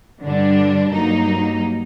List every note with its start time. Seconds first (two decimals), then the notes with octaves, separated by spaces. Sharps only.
0.22 G2 D3 G3 D4
0.91 G2 F#3 A#3 D#4